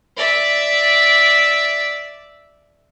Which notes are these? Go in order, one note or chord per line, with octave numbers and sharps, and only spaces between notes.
D5 E5